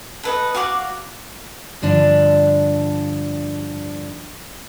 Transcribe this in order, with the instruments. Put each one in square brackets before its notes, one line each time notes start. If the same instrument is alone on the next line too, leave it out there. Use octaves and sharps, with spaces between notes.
[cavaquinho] A4 B4 D#5
F#4 F5 F#5 D6
[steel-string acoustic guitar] G2 D3 F3 D4